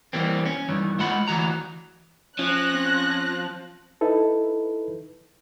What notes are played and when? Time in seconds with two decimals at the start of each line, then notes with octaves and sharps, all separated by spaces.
0.13 E2 E3 G3 A#3 C4
0.46 C#4
0.69 G2 D#3 E3
0.99 G#3 F4 F#5 B5
1.28 D2 E3 F#4 A#5
2.39 F3 C#4 F#6 A#6
2.74 C4
4.01 D#4 E4 A4 B4